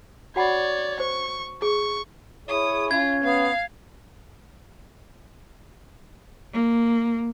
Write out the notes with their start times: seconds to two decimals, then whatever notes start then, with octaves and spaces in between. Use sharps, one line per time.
0.36 F#4 C#5 D5 F#5 B5
1.00 C5 C#6
1.62 G#4 C#6
2.49 E4 G#4 C#5 D#6
2.91 C#4 F4 G#6
3.24 B3 F5
6.53 A#3